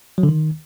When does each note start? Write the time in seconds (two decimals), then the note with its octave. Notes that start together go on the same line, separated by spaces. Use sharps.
0.18 F#3
0.23 D3
0.29 D#3